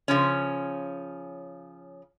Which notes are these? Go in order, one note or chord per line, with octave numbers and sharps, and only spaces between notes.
C#3 F3 C#4